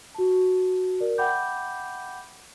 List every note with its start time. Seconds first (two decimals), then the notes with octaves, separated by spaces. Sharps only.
0.15 F#4 A5
1.00 A#4 D5
1.18 E5 F#5 G5 B5 D6 G6